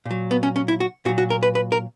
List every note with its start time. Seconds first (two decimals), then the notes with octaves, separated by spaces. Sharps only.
0.05 A#2
0.11 F#3
0.31 B3
0.43 C#4
0.56 C#4
0.68 E4
0.80 F#4
1.05 A#2 F#4
1.09 F#3
1.18 F#4
1.30 A#4
1.43 B4
1.55 B4
1.72 A#4